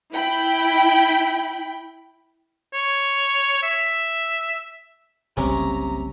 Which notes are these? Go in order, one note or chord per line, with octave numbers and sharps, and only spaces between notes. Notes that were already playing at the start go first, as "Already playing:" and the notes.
E4 G5 B5
C#5
E5
F#1 C2 C3 F#3 C#4 A#5